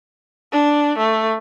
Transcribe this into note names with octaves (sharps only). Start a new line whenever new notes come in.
D4
A3